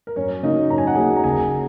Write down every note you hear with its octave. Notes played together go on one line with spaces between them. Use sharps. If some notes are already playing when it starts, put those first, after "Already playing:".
A#4
F#2 C#4 C#5
C#3 F#3 A#3 D#4 D#5
F#2 A#5
G#5
F#5
C#3 F#3 A#3 G#4 G#5
A#5
F#1 G#4 G#5